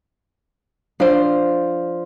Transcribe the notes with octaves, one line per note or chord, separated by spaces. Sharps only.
F3 D4 C5